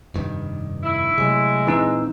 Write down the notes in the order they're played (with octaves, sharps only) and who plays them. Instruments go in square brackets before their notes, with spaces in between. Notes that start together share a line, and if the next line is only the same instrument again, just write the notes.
[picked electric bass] F1 G2 D#3
[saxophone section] E4
[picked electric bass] C3 F#3 A3 [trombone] G#3
[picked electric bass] A#2 C4 D4 [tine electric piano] E3 D#4 E6